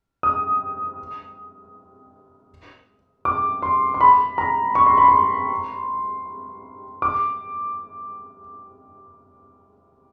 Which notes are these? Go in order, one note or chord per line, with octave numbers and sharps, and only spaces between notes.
D#6
D6
C6
C6
B5
A#5
C#6
C6
B5
C6
D6